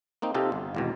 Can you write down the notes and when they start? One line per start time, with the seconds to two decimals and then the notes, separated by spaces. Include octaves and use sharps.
0.22 A#3 C4 D#4
0.34 C3 D#4 F4 G4 A4
0.52 G1
0.75 G#1 E2 B2